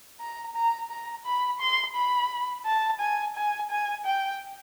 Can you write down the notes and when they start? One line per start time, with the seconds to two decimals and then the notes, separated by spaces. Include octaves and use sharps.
0.20 A#5
0.55 A#5
0.90 A#5
1.25 B5
1.60 C6
1.95 B5
2.66 A5
3.00 G#5
3.35 G#5
3.70 G#5
4.05 G5